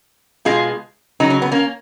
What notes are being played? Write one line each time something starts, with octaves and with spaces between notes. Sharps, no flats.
B2 G#3 F4 G#4
C#3 F#3 D#4
C#4
B3
A#3 C#4